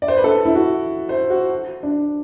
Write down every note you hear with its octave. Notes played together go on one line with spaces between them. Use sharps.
D5
C5
B4
A4
E4
F#4
C5
F#4
D4